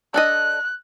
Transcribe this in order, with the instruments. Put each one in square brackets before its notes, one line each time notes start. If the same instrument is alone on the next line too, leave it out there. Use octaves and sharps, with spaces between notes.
[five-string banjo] D4 A4 D#5 [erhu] F#6